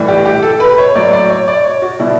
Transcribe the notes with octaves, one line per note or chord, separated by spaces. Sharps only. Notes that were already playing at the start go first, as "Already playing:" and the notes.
Already playing: A2 E3 G3
G4
G4
A4
B4
C#5
A2 F#3 D5
D5
C#5
D5
C#5
F#4
B2 G3 E4